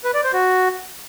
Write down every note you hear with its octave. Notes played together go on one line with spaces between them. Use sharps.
B4
D5
C5
F#4